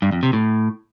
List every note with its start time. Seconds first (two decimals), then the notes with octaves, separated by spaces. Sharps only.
0.02 G2
0.12 F2
0.23 C3
0.33 A2